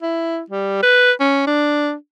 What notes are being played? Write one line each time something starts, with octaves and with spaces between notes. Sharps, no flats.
E4
G3
B4
C#4
D4